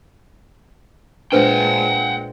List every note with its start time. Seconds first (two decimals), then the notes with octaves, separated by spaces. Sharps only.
1.32 A#2 G#3 D4 B4 C5 F#5 G5